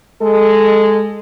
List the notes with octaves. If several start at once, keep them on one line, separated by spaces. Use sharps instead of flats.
G#3 A4